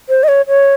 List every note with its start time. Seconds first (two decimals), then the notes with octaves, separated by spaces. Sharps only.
0.09 C5
0.23 D#5
0.28 C#5
0.48 C#5